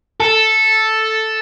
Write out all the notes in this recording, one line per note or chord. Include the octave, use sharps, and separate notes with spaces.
A4